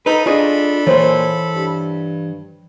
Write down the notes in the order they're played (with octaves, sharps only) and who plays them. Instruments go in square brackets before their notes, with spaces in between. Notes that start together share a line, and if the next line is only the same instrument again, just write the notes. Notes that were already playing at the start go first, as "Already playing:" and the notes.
[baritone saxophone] D#4 [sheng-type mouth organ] A4 B5 [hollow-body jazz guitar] B4
[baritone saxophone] D4 [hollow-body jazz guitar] F4 G#4 C#5 [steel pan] D#5
[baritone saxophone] A#2 [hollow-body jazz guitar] E3 [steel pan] C5 C#5
[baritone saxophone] G2